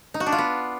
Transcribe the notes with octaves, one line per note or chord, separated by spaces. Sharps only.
D#4
F#4
D4
F4
B3